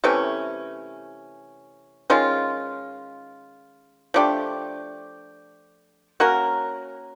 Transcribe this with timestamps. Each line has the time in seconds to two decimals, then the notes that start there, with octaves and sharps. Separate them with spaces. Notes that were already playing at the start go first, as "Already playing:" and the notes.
0.04 C3 E3 A3 C#4
2.10 D#3 G#3 C#4 F4
4.14 F3 A3 D4 G4
6.20 A#3 C#4 F#4 A#4